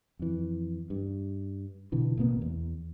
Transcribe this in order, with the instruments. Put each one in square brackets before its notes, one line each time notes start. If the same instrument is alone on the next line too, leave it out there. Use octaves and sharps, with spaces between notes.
[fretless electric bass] F2 E3
G2
B2 D3 E3
A1 B2 A#3 B3
E2